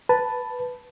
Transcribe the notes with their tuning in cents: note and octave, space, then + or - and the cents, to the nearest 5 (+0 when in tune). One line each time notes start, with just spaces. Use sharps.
B4 +0 A5 +0